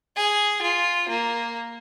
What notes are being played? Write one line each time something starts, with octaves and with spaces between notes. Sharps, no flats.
G#4
F4
A#3